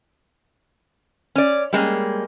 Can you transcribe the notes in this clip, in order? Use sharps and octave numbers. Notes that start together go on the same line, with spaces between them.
C#4 D5
G3 G#3 A#3 C#4